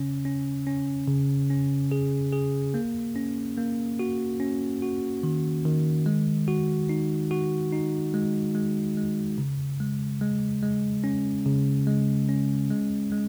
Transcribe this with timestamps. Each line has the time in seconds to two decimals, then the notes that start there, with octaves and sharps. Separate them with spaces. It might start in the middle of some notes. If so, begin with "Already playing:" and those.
Already playing: C#3 C#4
0.25 C#4
0.67 C#4
1.08 C#3
1.50 C#4
1.92 G#4
2.33 G#4
2.74 A#3
3.16 C#4
3.57 A#3
3.99 F#4
4.40 C#4
4.82 F#4
5.23 D#3
5.65 D#3
6.06 G#3
6.48 F#4
6.89 D#4
7.31 F#4
7.73 D#4
8.14 G#3
8.55 G#3
8.97 G#3
9.38 C#3
9.80 G#3
10.21 G#3
10.63 G#3
11.04 C#4
11.46 C#3
11.87 G#3
12.29 C#4
12.70 G#3
13.12 G#3